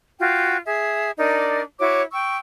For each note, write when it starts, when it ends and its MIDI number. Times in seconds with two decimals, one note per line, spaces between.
0.19 0.56 65
0.19 0.56 66
0.19 0.56 79
0.65 1.11 68
0.65 1.11 76
1.18 1.62 62
1.18 1.62 63
1.18 1.62 70
1.18 1.62 74
1.79 2.01 64
1.79 2.01 66
1.79 2.01 73
1.79 2.01 86
2.13 2.37 79
2.13 2.37 85
2.13 2.37 88